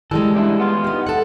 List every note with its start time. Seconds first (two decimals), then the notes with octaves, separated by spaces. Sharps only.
0.11 E3 G3 G#3 A4
0.34 C#2 D4 E4
0.59 B3 F4
0.84 D#4 G4
1.06 A4 F#5